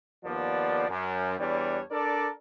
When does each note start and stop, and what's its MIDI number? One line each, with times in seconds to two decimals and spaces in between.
0.24 0.85 39
0.24 0.85 53
0.24 0.85 59
0.24 0.85 74
0.88 1.33 42
1.38 1.79 40
1.38 1.79 55
1.38 1.79 62
1.38 1.79 73
1.38 1.79 74
1.91 2.28 62
1.91 2.28 69
1.91 2.28 70
1.91 2.28 74